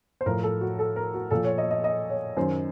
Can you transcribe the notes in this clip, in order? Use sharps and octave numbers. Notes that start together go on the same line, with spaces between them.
C5
A2 F3 A#4
A4
F#4
A4
A#4
F#4
A#2 F3 A4
C#5
D#5
D#5
D#5
C#5
F#2 D#3 C5